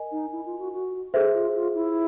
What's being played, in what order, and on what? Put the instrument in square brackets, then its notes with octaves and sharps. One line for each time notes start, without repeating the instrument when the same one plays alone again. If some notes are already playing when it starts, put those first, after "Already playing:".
Already playing: [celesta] A#4 D#5 G#5
[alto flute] D#4
E4
F4
F#4
F#4
[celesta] G#4 C5 E5 [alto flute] A4
[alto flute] F4
F4
E4